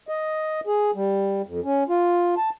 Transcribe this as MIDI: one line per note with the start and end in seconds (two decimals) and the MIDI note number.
0.08 0.60 75
0.67 0.91 68
0.95 1.42 55
1.47 1.60 41
1.64 1.84 61
1.89 2.35 65
2.37 2.50 81